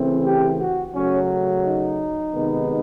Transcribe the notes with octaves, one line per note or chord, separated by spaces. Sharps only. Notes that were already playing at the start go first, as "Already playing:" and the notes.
Already playing: C#3 E3 A3 C4
G4
F#4
C#3 F#3 A3 C#4
D#4
C3 D#3 G#3 B3